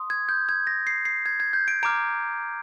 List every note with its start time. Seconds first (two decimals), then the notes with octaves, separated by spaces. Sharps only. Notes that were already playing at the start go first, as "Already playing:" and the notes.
Already playing: C6 D#6
0.10 G#6
0.29 G6
0.49 G#6
0.67 A#6
0.87 C7
1.05 C7
1.26 G#6
1.40 G#6
1.53 G6
1.68 D7
1.83 A#5 D6 F6 D7